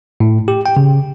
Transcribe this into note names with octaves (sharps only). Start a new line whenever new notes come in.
A2
G4
G5
C#3